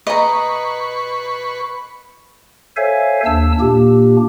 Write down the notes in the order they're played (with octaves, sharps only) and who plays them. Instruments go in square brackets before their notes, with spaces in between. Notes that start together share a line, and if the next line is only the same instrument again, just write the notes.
[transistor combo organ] B4 C#6 [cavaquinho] D#5 A#5
[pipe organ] A4 C5 C#5 E5 F5 G#5
D#2 D4 A5 E6
A#2 A#3 D4 G4